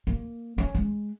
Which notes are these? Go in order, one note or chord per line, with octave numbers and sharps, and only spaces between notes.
A#3
C#4
G#3